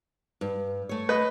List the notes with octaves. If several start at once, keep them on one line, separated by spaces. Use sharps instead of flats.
G2
A3 C#5
B4 D#5